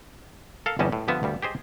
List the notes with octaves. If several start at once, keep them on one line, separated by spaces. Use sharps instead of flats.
A4 A#4 F5
G1 E2 G3 C#4 D#5 A5
A2
G2 D3 F3 B3 E5
D2 G2 G3
G4 G#4 C5 D#5